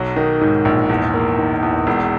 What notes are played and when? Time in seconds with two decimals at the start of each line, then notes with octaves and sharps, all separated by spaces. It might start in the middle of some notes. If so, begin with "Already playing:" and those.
Already playing: B1 F#3
0.16 D#3
0.41 G#2
0.65 A#1
0.89 E2
1.14 A#3
1.39 D#3
1.63 E2
1.87 E1